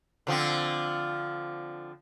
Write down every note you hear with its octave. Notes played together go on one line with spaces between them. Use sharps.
D3 F3 C4